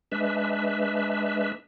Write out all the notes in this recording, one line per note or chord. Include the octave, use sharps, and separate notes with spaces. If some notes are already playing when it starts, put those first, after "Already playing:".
G#3 D4 B4 E5